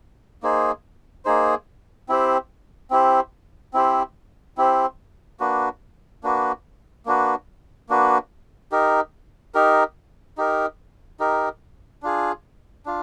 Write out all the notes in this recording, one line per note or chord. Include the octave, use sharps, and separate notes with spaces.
A#3 D#4 G#4 C5
A#3 D#4 G#4 C5
C4 E4 G4 C5
C4 E4 G4 C5
C4 E4 G4 C5
C4 E4 G4 C5
A#3 D4 F#4 B4
A#3 D4 F#4 B4
A#3 D4 F#4 B4
A#3 D4 F#4 B4
D#4 G4 A#4
D#4 G4 A#4
D#4 G4 A#4
D#4 G4 A#4
D4 F4 G#4
D4 F4